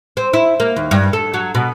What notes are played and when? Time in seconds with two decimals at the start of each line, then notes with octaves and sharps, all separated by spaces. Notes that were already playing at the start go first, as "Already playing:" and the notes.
0.17 C4
0.33 E4
0.60 A#3
0.76 D#2
0.91 G2
1.13 A4
1.34 F#3
1.55 B2